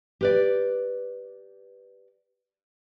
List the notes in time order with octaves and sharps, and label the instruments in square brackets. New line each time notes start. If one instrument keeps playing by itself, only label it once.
[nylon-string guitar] G4 B4 D5